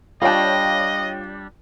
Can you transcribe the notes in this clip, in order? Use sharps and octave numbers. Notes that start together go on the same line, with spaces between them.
G3 D4 F4 C#5 D#5 G5